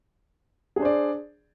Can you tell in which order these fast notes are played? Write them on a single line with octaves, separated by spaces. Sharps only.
G#4 D4 C5 D5